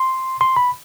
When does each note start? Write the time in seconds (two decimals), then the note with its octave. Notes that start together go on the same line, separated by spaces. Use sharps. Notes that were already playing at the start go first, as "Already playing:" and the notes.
Already playing: C6
0.41 C6
0.56 B5